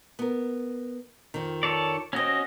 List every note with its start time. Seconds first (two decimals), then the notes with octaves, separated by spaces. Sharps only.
0.19 B3 A#4
1.34 F2 D#3
1.63 A4 C#5 D5
2.13 D#2 C4 C#4 F#4 D#5